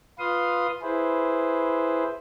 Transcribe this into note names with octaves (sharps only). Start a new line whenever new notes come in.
F4 B4 F5 C6 D#6
E4 G#4 B4 C5